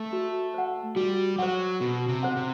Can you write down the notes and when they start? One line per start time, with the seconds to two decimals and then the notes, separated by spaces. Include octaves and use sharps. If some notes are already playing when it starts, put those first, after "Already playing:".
Already playing: A3
0.13 F#4
0.54 C5 F#5
0.96 G3 F#4
1.38 F#3 C5 F#5
1.80 B2 F#4
2.08 C3
2.23 C5 F#5
2.37 C3